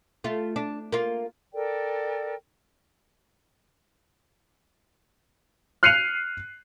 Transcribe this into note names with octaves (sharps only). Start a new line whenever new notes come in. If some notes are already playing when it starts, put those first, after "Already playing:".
A3 F4
D4
A#3 F4
A4 A#4 D5 G5
F6 F#6 C7 C#7 D#7 F7